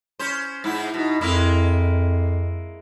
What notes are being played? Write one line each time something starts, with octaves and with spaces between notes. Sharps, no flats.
C#4 C5
G#2 E4
B2 D#4
F2 G#3 A#3 E4